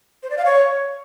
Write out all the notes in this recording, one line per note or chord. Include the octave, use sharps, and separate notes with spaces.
C5
D5
F5
C#5